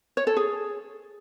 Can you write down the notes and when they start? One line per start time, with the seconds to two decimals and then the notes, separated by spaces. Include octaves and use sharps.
0.17 C#5
0.27 A4
0.37 G#4